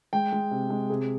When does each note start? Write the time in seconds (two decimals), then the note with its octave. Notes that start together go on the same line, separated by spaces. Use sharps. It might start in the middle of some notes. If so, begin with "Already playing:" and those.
0.13 G#3 G5
0.33 G#3
0.51 C3
0.70 G#3
0.90 C3 G#4